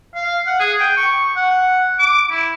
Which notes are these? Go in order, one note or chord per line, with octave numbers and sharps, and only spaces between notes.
F5
F#5
G#4
G5
C#6
F#5
D6
E4